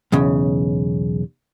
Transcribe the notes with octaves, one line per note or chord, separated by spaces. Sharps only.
B1 E2 C#3